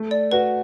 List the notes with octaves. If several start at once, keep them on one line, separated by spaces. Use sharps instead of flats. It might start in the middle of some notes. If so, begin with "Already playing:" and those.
Already playing: A3
D5
F#4 B4